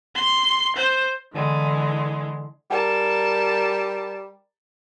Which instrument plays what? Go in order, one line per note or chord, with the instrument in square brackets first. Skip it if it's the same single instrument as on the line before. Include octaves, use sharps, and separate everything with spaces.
[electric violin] C6
C5
[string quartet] D3 E3 G#3
[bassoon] G3 [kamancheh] A#4 A5